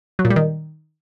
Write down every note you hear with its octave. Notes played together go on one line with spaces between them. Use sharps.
F#3
A#2
G3
D#3